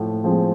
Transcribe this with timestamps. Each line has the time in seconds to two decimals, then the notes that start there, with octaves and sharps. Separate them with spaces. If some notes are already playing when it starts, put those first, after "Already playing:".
Already playing: A2 F3
0.24 F3 G#3 C4